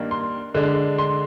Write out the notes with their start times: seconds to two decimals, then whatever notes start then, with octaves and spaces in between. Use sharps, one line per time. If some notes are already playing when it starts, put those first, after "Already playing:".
Already playing: G2 D#3 A#3 D4
0.11 C6
0.54 D3 G#3 D4
0.98 C6